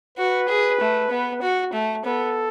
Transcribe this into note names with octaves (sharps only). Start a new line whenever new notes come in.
F#4 B4
G#4
A3
B3
F#4
A3
B3 A4